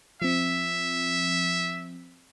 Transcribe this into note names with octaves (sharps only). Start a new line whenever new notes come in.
F3 C4 E5